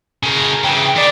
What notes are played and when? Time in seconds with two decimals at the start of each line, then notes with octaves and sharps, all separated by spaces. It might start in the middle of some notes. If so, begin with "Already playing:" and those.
0.23 C#3 A#4
0.64 C#3 E3 G5
0.96 D#3 D5